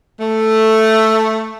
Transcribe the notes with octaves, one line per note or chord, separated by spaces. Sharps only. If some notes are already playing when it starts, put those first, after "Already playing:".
A3